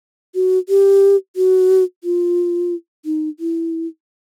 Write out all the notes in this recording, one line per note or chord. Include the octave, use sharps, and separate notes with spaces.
F#4
G4
F#4
F4
D#4
E4